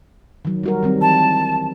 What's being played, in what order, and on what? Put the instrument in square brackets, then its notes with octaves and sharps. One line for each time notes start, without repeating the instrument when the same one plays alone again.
[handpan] D#3 F#3
G3 F#4 A#4
D#3 G3 C4
[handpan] E3 [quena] A5